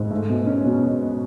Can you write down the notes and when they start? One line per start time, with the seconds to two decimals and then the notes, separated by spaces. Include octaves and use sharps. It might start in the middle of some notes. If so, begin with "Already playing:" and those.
Already playing: G#2
0.11 A3
0.29 B2
0.47 C#4
0.66 B2